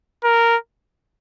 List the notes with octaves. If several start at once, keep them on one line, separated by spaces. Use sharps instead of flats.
A#4